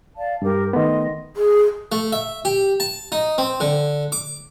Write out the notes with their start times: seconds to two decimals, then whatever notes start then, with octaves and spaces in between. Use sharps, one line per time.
0.17 D5 F5 A5
0.42 G2 G4 A#4
0.73 D#3 A3 B3 D#5 C6
1.37 G#4
1.92 A3
2.12 E5
2.45 G4
2.80 A5
3.12 D#4
3.38 C4
3.60 D3
4.12 D6